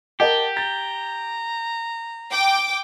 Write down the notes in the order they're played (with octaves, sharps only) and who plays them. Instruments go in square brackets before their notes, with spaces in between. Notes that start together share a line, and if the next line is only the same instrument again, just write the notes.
[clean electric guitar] G4 [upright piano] A#4 D#5 F#5 [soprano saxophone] A5
[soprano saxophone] A#5 [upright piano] A6
[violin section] G5 D6